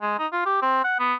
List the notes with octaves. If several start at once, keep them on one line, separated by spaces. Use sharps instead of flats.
G#3
D#4
F4
G4
C4
F#5
B3